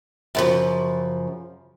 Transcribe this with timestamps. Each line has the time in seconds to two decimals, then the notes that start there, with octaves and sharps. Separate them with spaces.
0.35 F#2 C#3 F3